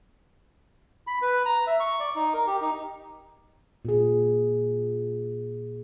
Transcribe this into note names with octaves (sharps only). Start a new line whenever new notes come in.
B5
B4
A#5
E5
C#6
D5
D#4
A#4
G4
D#4
A#2 G#4